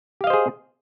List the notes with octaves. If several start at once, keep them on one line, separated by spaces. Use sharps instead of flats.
G4 G#4 C5 D#5 F5